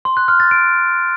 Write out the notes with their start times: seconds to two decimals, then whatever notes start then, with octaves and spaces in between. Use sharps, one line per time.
0.05 C6
0.17 F#6
0.28 F6
0.40 A6
0.51 D7